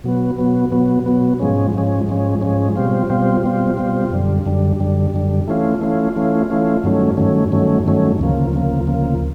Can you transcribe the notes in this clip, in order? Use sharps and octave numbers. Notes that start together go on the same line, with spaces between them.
B2 F#3 B3
B2 F#3 B3
B2 F#3 B3
B2 F#3 B3
G#2 F3 G#3 C#4
G#2 F3 G#3 C#4
G#2 F3 G#3 C#4
G#2 F3 G#3 C#4
B2 G3 C4 F4
B2 G3 C4 F4
B2 G3 C4 F4
B2 G3 C4 F4
F#2 D3 G3
F#2 D3 G3
F#2 D3 G3
F#2 D3 G3
E3 A3 C#4 F4
E3 A3 C#4 F4
E3 A3 C#4 F4
E3 A3 C#4 F4
G2 D#3 F#3 A3 C#4
G2 D#3 F#3 A3 C#4
G2 D#3 F#3 A3 C#4
G2 D#3 F#3 A3 C#4
D2 C#3 F3 A#3
D2 C#3 F3 A#3
D2 C#3 F3 A#3